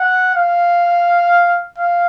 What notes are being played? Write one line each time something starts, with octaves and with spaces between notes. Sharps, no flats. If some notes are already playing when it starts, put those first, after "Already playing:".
Already playing: F#5
F5
F5